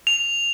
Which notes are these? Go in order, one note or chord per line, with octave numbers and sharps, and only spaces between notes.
F7